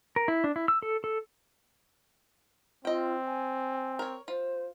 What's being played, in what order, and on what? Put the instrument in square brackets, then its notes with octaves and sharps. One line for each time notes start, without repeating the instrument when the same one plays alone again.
[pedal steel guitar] A#4
E4
D4
E4
E6
A4
A4
[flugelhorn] C4 [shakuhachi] F4 [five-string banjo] D#5 G5
[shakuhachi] G#5
[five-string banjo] A#4 C#5
[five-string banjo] F4 [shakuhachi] C5